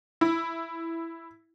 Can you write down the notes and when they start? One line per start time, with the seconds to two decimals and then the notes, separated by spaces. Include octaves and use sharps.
0.21 E4